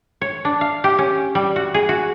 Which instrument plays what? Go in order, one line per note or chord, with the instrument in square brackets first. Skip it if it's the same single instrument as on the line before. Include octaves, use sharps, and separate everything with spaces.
[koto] C#5
D4
F5
G4
C#4
G3
F#4
G#4
F#4